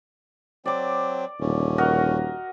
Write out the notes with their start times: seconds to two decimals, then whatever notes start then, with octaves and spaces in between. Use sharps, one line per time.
0.65 F#3 C4 D5 D6
1.41 D#1 D3 C#4
1.78 F#4 A#4 D#5